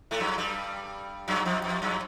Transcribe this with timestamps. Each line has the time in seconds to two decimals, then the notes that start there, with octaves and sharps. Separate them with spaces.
0.11 A2 A3
0.20 F#2 F#3
0.38 G2 G3
1.28 F#2 F#3
1.45 F2 F3
1.64 F2 F3
1.82 F#2 F#3